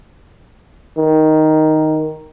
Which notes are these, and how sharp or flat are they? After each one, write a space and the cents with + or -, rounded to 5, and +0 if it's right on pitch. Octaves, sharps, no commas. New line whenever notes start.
D#3 +5